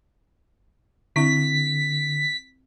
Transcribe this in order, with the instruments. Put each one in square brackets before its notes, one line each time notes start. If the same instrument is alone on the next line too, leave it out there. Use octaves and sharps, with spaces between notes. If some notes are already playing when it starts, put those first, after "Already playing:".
[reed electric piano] D3 [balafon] C4 E4 E5 [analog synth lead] B6